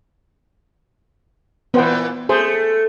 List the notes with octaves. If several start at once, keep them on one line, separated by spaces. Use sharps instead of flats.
A#2 E3 B3 C5 G5
A3 G#4 C5